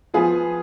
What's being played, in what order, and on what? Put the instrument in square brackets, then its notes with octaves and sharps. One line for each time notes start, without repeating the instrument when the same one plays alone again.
[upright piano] F3 B3 F4 G#4 B4